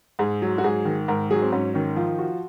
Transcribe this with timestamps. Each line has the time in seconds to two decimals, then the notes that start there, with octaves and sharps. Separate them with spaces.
0.19 G#2 G#4
0.42 F#3
0.58 F#4
0.64 G#2 G#4
0.85 D#3
1.08 G#2 A#4
1.30 F#3 G#4
1.42 C4
1.52 G#2 C#4
1.74 D#3 C#4
1.96 F3 F4
2.19 F#4